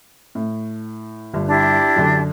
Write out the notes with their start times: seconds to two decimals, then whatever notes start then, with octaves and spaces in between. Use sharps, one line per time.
0.35 A2
1.33 G1 G2
1.48 D4 E4 G4
1.96 F#2 D3